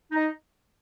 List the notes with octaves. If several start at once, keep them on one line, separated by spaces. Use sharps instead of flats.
D#4